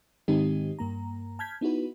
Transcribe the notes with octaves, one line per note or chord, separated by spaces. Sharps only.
G#2 D#3 G#3 C4 D#4 G4
G2 A#3 A#5
A5 F6 G6 G#6 B6
B3 D#4 E4 F#4 B4